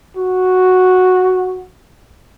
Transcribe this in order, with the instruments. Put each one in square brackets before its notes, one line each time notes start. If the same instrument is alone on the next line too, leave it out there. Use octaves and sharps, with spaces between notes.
[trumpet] F#4